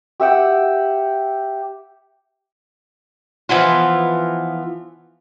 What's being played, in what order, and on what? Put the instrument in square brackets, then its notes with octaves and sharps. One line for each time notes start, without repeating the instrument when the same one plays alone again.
[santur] G4 E5 F#5 G5
[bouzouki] E3 F3 B3 F4